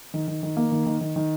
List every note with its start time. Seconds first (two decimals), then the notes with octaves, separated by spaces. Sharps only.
0.14 D#3
0.28 D#3
0.43 D#3
0.57 A#3
0.72 D#3
0.86 D#3
1.01 D#3
1.16 D#3